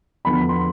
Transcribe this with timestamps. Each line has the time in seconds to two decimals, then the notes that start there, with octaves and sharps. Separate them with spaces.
0.25 E2 D3 F3 B3 B5
0.49 C6